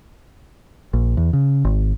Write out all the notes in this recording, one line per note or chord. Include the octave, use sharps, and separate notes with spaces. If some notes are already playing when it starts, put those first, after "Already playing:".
A#1
E2
C#3
G#1